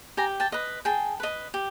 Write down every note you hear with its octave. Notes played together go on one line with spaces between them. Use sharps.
G4 G#5 A#5
G5 A5
B4 D#5
G#4 G5 A5
B4 D#5
G4